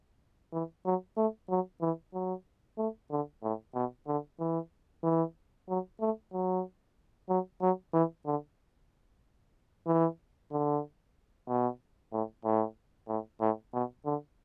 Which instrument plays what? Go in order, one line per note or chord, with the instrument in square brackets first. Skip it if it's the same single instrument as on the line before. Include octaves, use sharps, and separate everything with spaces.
[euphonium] E3
F#3
A3
F#3
E3
F#3
A3
D3
A2
B2
D3
E3
E3
F#3
A3
F#3
F#3
F#3
E3
D3
E3
D3
B2
A2
A2
A2
A2
B2
D3